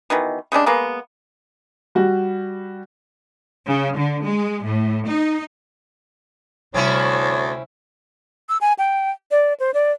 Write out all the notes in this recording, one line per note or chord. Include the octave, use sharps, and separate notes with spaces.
B2 D#3 E3
C#3 G3 G#3 D4
G#3 A#3 B3
G3 F#4
C#3
D3
G#3
A2
D#4
D2 C3 G3 C4 C#4 E4 C#5
E6
G#5
G5
D5
C5
D5